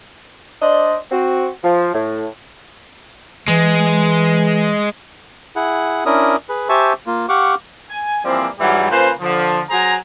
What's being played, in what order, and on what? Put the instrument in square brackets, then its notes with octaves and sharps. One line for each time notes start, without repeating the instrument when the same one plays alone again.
[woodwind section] D4 C5 D5 D#5
C4 F#4
F3
A2
[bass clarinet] E3 [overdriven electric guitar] G#3
[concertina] E4 G#4 F#5
C#4 D4 E4 A#4 D#6
G#4 B4
G4 C5 E5 G#5 A5 C#6
A#3 F4
G4 F5 F#5 C#6 D6
[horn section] G#5
E3 F3 G3 A#3 C4
G#2 E3 F#3 G3
C#3 A#3 F4 B4 C5
D3 F3
F#3 G#4 C5 G#5 A#5